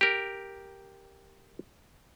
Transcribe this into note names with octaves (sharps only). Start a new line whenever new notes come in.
G4 A#4